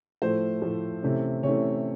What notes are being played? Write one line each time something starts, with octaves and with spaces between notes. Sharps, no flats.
A2 F3 A3 C5
A2 F3 A3
C3 E3 A3 C#4
C3 E3 A3 C#4 C#5